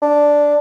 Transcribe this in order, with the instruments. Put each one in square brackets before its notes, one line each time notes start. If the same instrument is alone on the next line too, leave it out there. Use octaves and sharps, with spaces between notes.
[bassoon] D4